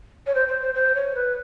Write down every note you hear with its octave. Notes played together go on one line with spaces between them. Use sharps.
C#5
C5
C5
C5
C5
C#5
B4